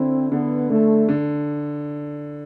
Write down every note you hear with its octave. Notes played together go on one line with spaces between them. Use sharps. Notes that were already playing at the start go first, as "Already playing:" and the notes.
Already playing: D3 C4 E4
D3 B3
D3 A3
D3